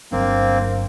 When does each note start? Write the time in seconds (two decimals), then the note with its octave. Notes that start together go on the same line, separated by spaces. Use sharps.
0.12 G1 F#3 A#3 C4 D4